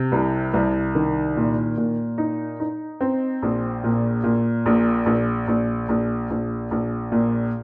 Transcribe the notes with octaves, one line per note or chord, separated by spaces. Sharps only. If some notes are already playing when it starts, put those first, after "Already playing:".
Already playing: C3
C2
C2
D#3
A#2
A#2
D#4
D#4
C4
A#1
A#2
A#2
A#1
A#1
A#1
A#1
A#1
A#1
A#2